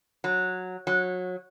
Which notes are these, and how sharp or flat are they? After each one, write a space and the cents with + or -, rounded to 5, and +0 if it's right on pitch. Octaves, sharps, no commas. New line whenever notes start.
F#3 -10
F#3 -25